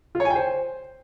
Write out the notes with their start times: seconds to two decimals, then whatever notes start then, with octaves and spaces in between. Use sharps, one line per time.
0.15 F4
0.20 C#5
0.25 G#5
0.30 G5
0.36 C5